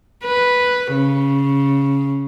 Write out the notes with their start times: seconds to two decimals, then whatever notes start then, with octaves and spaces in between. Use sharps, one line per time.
0.25 B4
0.93 C#3